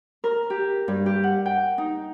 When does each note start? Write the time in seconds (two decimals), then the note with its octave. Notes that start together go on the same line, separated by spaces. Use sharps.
0.24 A#4
0.50 G4
0.88 G2
1.06 G4
1.23 F#5
1.46 G5
1.78 D#4